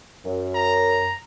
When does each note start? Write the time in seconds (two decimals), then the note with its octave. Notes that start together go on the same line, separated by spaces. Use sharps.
0.25 F#2
0.55 A#5